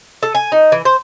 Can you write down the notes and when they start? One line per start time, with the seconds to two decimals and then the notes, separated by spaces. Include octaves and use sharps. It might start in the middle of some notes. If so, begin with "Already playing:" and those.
0.23 A4
0.35 G#5
0.52 D#4
0.72 E3
0.85 C5